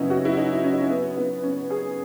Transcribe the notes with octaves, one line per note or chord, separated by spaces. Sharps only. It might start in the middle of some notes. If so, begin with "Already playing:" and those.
Already playing: F#2 C#3 F#3 B3 C#4 D#4 E4
F#4
E4
D#4
C#4
D#4
C#4
B3
B3
C#4
G#4